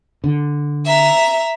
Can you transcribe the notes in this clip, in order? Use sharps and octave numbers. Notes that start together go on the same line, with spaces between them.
D3
E5 A#5